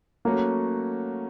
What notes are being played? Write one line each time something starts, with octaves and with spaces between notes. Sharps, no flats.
F#3 A3 A#3 C#4 F#4